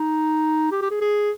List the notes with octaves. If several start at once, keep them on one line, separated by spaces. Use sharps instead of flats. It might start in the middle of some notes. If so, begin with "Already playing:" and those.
Already playing: D#4
G4
G4
G#4
G#4